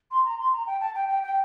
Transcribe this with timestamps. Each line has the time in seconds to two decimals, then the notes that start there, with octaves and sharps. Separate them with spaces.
0.11 C6
0.25 A#5
0.39 C6
0.53 A#5
0.67 G5
0.81 A5
0.95 G5
1.09 G5
1.23 G5